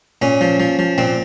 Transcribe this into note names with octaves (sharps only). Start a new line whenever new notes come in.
A#2 C#4
F3
F3
F3
A#2 C4